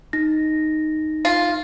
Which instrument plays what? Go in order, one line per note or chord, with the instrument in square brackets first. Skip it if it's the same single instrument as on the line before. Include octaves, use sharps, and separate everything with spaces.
[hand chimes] D#4 A#6
[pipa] F4